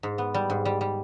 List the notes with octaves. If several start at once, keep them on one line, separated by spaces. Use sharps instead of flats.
G#2
B3
G3
G#2
G3
G3